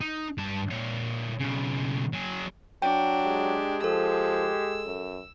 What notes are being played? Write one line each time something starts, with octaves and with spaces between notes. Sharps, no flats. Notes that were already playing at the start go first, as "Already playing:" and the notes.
D#4
G2 A5
A#2 C#5
B1 C#3
F#3 G#4
F#3 D4 G5
G#3 G4
F3 A4 E6
F#2